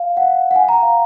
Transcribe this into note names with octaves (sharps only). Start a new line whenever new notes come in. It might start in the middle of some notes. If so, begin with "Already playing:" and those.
Already playing: F5
F#5
F#5
G#5
A#5
F5